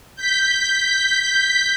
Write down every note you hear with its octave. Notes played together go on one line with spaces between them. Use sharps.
G6 B6